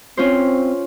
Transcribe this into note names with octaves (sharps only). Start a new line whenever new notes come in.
C4 C#4 F4 C5